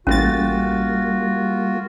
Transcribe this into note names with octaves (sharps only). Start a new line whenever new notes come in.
A1 G3 A#3 C#4 F4 F#4 A6